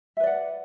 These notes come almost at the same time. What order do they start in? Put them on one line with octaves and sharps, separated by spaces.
E5 B4 D5 F#5